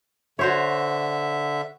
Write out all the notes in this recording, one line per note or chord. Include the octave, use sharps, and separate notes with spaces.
D3 F#4 C5 C#5 E5